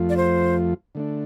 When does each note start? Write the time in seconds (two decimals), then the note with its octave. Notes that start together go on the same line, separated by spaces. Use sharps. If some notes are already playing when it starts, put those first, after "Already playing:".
Already playing: F2 F3 A3 F4
0.09 D5
0.17 C5
0.95 D3 A3 D4